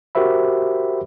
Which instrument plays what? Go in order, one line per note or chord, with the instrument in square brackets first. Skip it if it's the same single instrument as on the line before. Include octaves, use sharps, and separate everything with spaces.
[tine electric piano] F#4 G4 A#4 C5 E5 B5